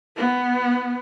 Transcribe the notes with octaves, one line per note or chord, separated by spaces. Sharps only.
B3